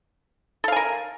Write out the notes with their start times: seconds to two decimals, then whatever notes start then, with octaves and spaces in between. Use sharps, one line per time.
0.64 A4
0.68 F5
0.72 G#5
0.76 A#4